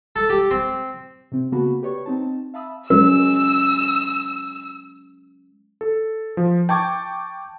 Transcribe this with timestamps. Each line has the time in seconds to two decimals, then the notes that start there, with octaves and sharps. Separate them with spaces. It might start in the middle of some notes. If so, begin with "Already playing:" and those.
0.16 A4
0.30 G4
0.51 C4
1.32 C3 C4
1.52 C#3 A#3 B3 F#4 A5 B5
1.83 G4 B4 C#5 D5 C#6
2.06 C4 D#4 A5
2.54 E5 F5 A5 B5 D#6 E6
2.90 F#3 G#3 C#4 A#4 E6
5.81 A4
6.37 F3
6.69 G5 A5 C#6 D6 G#6